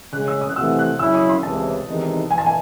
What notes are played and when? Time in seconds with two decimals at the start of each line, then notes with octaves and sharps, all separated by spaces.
0.13 C#3 G#3 C#4 F#6
0.28 E6
0.41 D#6
0.49 F#6
0.56 C3 E3 A3 C4 F#4 E6
0.79 F#6
0.99 C#3 F#3 C#4 E4 E6
1.15 D#6
1.29 C6
1.43 C#2 C3 E3 A5
1.88 E2 C3 D#3 G#3 D#4
2.31 E3 G#5
2.38 A5
2.46 G#5